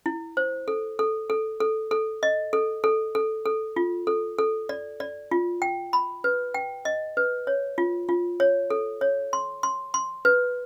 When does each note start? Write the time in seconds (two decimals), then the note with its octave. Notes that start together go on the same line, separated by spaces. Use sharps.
0.06 E4
0.37 C5
0.68 A4
0.99 A4
1.30 A4
1.60 A4
1.91 A4
2.23 D#5
2.53 A4
2.84 A4
3.15 A4
3.46 A4
3.76 F4
4.07 A4
4.38 A4
4.69 D5
5.00 D5
5.31 F4
5.62 G5
5.93 B5
6.24 B4
6.54 G5
6.85 D#5
7.17 B4
7.47 C#5
7.78 F4
8.09 F4
8.40 C#5
8.70 A4
9.01 C#5
9.33 C6
9.63 C6
9.94 C6
10.25 B4